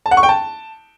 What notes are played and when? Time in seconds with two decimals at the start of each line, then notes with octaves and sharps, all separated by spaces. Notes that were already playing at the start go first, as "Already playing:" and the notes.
0.06 A5
0.11 F#5
0.17 C#6
0.23 G5
0.29 A5